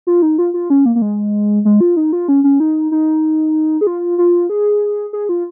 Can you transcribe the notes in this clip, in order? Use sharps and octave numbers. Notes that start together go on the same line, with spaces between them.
F4
D#4
F4
F4
C#4
A#3
A#3
G#3
G#3
F4
D#4
F4
C#4
C#4
D#4
D#4
G#4
F4
F4
G#4
G#4
F4